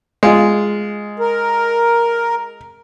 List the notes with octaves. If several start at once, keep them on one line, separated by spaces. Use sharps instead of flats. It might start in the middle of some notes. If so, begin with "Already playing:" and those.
G#3 F4
A#4